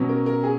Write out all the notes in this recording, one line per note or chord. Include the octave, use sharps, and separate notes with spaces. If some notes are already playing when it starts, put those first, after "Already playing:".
Already playing: B2 F#3 C#4
A#4
A#4
G#4